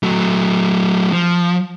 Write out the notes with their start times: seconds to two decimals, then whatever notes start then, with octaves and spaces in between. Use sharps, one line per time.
0.03 F#3 A3
1.12 F3